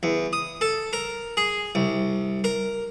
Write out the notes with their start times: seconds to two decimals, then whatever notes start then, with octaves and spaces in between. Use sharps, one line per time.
0.03 E2
0.33 D#6
0.61 A4
0.93 A#4
1.37 G#4
1.75 C2
2.44 A#4